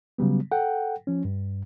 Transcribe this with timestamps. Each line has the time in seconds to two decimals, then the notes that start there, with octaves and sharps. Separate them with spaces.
0.18 C#3 F#3 G3 B3
0.52 A4 F#5 G5
1.07 F3 C#4
1.25 G2